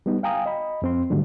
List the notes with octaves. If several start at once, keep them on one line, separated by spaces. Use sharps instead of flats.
G3 B3 D#4
F5 G5 G#5 A#5 D#6
D#5 B5
F2 C4 C6
G#2 D3 D#3 F#3 G3 A3